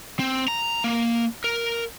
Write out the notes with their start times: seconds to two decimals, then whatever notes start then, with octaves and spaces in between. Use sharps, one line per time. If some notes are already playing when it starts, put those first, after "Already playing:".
0.19 C4
0.48 A#5
0.84 A#3
1.44 A#4